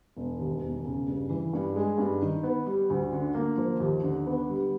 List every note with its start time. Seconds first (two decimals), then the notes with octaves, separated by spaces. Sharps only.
0.17 E1
0.39 D#2
0.62 E1
0.85 C#3
1.07 G2
1.30 E3
1.53 G2
1.76 G#3
1.98 G2
2.22 D#3
2.43 B3
2.66 G3
2.90 D2
3.13 D3
3.34 A#3
3.58 F3
3.80 D#2
4.03 D3
4.26 B3
4.49 G3